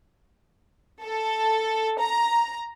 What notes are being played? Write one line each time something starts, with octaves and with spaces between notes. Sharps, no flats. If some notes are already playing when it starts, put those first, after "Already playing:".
A4
A#5